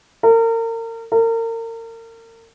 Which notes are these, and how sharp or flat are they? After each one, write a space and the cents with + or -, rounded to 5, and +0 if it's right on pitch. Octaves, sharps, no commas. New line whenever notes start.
A#4 -35
A#4 -35